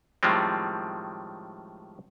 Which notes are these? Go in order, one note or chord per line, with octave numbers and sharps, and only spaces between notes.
A2 D#3 F3 G3 G#3 C4